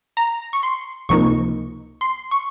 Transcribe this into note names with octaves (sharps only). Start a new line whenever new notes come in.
A#5
C#6
C6
C#2 C3 F3 A#3 D#4 C#6
C6
C#6